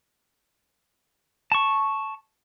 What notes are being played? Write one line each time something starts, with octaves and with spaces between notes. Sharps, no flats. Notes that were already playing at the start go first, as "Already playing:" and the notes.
A5 C#6